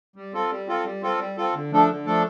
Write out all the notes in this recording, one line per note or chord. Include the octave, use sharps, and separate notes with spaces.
G3
C4 F4 A4
G3
C4 F4 A4
G3
C4 F4 A4
G3
C4 F4 A4
D3
F3 A3 D4 A4
D3
F3 A3 D4 A4